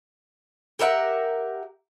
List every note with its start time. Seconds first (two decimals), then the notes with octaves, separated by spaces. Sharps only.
0.79 G4 A#4 E5 F#5